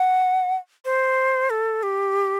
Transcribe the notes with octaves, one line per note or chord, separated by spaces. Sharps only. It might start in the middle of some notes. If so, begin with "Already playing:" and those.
Already playing: F#5
C5
A4
G4